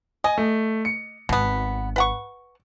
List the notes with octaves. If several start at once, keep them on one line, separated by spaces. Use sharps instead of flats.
D#5 G#5
A3
C#7
G#1 B2 B3
B4 F#5 C#6